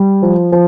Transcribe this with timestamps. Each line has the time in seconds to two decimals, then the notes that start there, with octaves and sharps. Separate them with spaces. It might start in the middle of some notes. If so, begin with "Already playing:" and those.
Already playing: G3
0.22 F3
0.52 F3